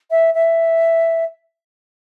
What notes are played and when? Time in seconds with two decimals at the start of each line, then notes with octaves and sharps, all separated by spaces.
0.10 E5
0.34 E5